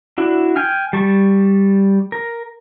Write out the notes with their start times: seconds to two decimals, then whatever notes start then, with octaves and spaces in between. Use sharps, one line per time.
0.18 D4 E4 F#4
0.56 G5 G#5 F6
0.93 G3 A5 C#6
2.12 A#4